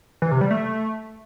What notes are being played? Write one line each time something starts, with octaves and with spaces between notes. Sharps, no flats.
E3
C3
G3
A3